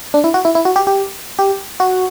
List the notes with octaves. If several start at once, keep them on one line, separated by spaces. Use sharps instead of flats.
D4
E4
F#4
E4
E4
F#4
G4
G4
G4
F#4